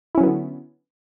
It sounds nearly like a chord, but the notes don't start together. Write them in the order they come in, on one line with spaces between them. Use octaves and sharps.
E4 C#4 F#3 B3 D3